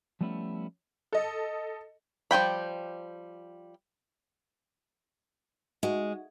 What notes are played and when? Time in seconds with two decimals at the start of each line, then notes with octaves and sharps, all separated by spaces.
0.21 F3 G3 A3 B3 C#4 E4
1.13 A4 D#5
2.31 F3 G3 G5 B5
5.83 G#3 D#4 F#4